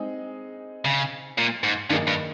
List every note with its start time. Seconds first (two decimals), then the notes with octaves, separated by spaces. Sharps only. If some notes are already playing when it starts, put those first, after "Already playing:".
Already playing: G#3 C4 D#4 G#4
0.85 C#3
1.38 A#2
1.63 G#2
1.90 G2 D#3 A#3 D#4 G#4
2.07 G2